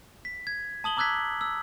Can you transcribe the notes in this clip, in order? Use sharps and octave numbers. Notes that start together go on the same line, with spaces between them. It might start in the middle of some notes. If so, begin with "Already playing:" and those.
B6
G#6
A5 D#6 F#7 G7
A#5 D6 E6 F#6 G#6 B6
E6